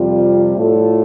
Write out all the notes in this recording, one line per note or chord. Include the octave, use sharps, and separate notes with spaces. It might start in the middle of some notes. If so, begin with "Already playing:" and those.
Already playing: F2 C3 G3 F4
A2 A3 F4 A4 D5